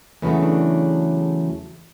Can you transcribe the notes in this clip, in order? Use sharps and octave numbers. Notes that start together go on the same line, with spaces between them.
E2 C#3 F#3 A3 B3
D4